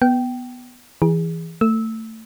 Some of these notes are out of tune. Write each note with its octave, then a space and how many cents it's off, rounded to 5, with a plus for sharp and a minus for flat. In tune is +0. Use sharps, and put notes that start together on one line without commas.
B3 +0 G5 -15
E3 +0 G#4 -20
A3 +25 E6 -15